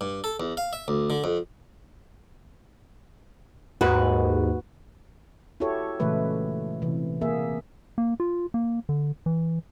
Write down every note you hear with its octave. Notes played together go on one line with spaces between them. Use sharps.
G2
A4
E2
F5
E5
D2
D3
F2
D#2 G#2 F#4 B4
E4 F#4 G4 A4 C#5
A#2 C#3 E3 G#3 A3 B4
C3 E3
A#3 G#4 E5
A#3
F4
A#3
D3
E3